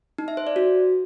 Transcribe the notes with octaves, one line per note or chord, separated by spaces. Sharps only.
D#4
E5
C5
D5
F#4